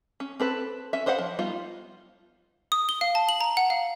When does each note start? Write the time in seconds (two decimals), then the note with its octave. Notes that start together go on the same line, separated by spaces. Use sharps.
0.20 C#4
0.40 C4 A4 B4
0.93 C#4 E5
1.06 B4 C5 D#5 F5 F#5
1.18 F3
1.39 G3 B3 D#4 F4
2.72 D#6
2.89 G7
3.01 F5
3.15 A5
3.29 F#7
3.41 A#5
3.57 F#5
3.70 F5